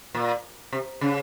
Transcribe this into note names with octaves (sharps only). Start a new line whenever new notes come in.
A#2
C3
C#3